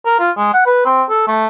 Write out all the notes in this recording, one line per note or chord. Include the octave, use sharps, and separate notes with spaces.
A#4
F4
G#3
F#5
B4
C4
A4
A3